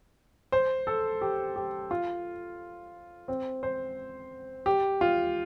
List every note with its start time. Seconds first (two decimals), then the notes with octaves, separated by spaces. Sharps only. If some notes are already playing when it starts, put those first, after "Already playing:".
0.52 C5
0.87 A4
1.21 G4
1.56 G4
1.91 F4
3.28 C4
3.63 C5
4.66 G4
5.01 F4